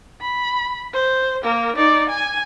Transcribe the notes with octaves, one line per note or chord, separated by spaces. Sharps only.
B5
C5
A#3 A#4
D#4 D5
G#5